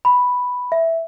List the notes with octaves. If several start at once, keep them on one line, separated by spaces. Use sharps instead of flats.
B5
E5